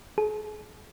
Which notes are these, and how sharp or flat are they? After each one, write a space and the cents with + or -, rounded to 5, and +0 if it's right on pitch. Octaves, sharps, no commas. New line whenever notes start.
G#4 +40